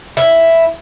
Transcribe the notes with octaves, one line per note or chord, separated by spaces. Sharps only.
E4